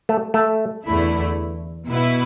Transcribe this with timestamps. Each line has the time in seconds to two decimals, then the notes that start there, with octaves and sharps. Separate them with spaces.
0.09 A3
0.34 A3
0.85 E2 D3 A3 E4
1.88 B2 B3 E4 B4